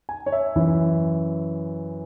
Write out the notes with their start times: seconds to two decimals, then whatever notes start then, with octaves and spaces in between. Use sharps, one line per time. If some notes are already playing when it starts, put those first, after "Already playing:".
0.09 G#5
0.26 C#5
0.32 E5
0.56 F#2 E3